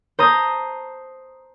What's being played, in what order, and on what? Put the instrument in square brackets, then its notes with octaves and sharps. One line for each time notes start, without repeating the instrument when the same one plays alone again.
[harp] C5 A5 A#5 D#6